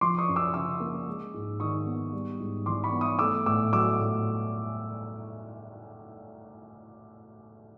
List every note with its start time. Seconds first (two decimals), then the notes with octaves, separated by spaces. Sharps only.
0.01 F3 C6 D6
0.18 C#6 D#6
0.28 F#2
0.36 D6 E6
0.54 C#3 D6 E6
0.80 A#3
1.07 G#3
1.34 G#2
1.60 D#3 C#6 D#6
1.86 B3
2.13 G3
2.40 G#2
2.66 E3 C6 D6
2.84 B5 C#6
2.92 B3
3.01 C#6 D#6
3.19 A3 D6 E6
3.46 A2 D6 E6
3.73 F#3 D6 E6
3.99 A2